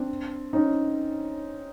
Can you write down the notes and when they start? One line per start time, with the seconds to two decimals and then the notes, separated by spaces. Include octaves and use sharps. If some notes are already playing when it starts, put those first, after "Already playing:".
Already playing: C4 D4
0.53 C#4 D#4